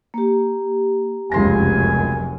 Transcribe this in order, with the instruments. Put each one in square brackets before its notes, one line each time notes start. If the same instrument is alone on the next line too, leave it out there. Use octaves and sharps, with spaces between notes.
[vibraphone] A#3 G4
[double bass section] F1 F#2 [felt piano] C#2 C6 A#6 [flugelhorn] G#5